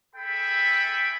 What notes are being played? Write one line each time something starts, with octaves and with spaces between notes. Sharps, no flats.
G#4 A4 E5 G5 B5